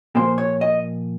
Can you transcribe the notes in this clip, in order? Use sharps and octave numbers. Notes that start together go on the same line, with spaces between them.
A#2 F3 A#3 C5
C#5
D#5